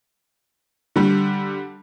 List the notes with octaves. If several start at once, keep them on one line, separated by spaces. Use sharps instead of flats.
D3 G3